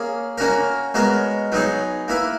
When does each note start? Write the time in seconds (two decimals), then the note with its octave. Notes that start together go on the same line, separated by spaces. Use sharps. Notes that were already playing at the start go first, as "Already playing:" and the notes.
Already playing: A#3 C#4 G#4
0.38 A#3 C#4 F#4 A#4
0.94 G#3 B3 F#4 A#4 C#5
1.52 F#3 B3 D#4 G#4 C#5
2.08 A#3 E4 B4